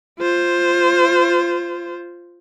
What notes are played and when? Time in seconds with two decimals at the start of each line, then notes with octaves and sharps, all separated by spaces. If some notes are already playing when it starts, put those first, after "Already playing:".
0.19 F4 C5